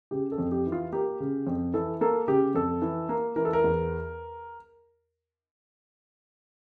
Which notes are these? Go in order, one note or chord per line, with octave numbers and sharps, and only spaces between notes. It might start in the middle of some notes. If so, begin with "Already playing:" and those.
C#3 G4
A4
F2
G4
E3
F4
A#3 G4
C#3
F2
E3 A4
A#3 A4
C#3 G4
F2 A4
E3
A#3
E3 A#4
A4
A#4
E2